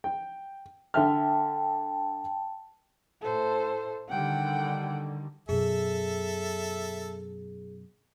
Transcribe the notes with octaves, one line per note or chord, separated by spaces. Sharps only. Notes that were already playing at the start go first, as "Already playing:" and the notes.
G5
D3 E5 G5 A5 F6
A2 A4 C5
D3 D#3 G3 F#5 G5
F#2 B2 G#4 A4 E5